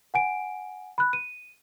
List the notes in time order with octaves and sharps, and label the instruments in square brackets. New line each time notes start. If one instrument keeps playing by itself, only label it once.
[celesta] F#5 G#5 D7
B5 F#6
D#7